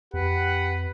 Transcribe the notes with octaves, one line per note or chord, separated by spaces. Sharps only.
F2 G4 B4 F#5